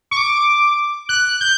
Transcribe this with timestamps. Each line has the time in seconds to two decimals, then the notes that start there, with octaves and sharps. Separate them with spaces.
0.11 C#6
0.17 D6
1.09 F#6
1.41 G6